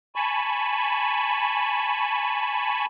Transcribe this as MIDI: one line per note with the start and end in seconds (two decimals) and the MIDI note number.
0.16 2.86 80
0.16 2.86 81
0.16 2.86 83
0.16 2.86 85